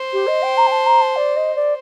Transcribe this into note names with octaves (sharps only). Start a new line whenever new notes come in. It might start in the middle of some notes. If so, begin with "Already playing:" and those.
Already playing: C5
G4
D#5
G5
A#5
G5
A5
A#5
A5
D5
D#5
D5